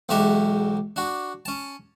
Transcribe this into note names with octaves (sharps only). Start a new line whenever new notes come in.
B1 E2 G#2 F#4 G4 E5
D4 F#4
C#4 A5